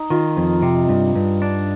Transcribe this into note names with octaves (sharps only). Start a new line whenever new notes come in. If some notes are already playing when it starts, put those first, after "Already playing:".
Already playing: D#4
D#3 F4
F2
C3
G2
G2
D4